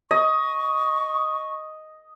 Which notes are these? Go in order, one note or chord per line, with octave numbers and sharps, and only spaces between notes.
D#5 C#6